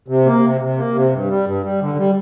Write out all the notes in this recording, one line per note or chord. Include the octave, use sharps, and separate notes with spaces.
C3
A#3
C3
C3
A#3
C3
G2
G3
G2
G3
D3
G3